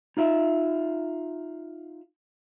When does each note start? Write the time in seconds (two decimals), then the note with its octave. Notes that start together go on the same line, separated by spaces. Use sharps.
0.17 D#4 F4 E5